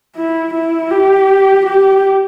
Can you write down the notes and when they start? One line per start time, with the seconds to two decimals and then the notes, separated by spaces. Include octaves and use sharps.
0.16 E4
0.54 E4
0.91 G4
1.66 G4